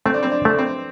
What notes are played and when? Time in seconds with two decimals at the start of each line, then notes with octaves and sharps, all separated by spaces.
0.05 A3 C4
0.14 D4
0.23 C4
0.31 D4
0.45 A3 D4
0.58 C4